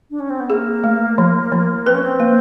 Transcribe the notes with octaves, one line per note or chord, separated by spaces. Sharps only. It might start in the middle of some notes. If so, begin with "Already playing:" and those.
D4
C#4
C4
B3
A#3 G#4
A3
F3
F3
C4 B4
C#4
C4
A#3